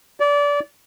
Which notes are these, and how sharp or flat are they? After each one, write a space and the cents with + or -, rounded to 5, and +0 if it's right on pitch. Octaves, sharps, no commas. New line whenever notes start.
D5 -25